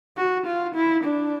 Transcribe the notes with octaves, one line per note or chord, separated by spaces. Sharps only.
F#4
F4
E4
D4